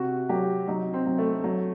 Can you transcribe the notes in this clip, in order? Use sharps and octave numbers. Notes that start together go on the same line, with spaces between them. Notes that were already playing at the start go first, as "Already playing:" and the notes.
Already playing: C3 F#4
F#3 G4
F#3 D#4
C4
F#3
A3
F#3